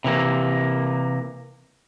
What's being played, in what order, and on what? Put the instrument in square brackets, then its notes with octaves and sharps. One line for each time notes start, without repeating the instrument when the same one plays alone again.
[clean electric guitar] C3 E3 A#3